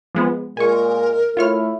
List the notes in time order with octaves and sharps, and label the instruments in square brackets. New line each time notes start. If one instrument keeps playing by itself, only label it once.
[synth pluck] F3 G#3 B3
[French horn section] A#2 G#3 [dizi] A#4 [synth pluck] G#5 C#6
[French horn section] A3 E4 [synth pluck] F4 C#5 F6